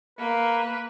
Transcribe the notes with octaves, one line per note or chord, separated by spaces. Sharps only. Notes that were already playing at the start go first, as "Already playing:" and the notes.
A#3 B4